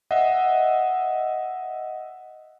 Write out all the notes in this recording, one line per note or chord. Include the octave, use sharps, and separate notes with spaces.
D#5 E5 F#5